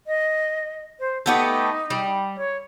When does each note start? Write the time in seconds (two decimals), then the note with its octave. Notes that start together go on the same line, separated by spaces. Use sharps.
0.07 D#5
0.99 C5
1.26 A3 B3 D#4 G4
1.90 G3
2.37 C#5